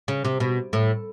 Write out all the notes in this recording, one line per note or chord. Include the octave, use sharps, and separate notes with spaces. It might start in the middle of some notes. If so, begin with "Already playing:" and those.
C#3
C3
B2
A2